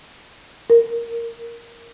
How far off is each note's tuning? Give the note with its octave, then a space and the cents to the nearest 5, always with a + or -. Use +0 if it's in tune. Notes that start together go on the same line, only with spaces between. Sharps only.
A#4 +0